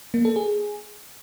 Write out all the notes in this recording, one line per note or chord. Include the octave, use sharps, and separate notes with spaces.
A#3
A4
G#4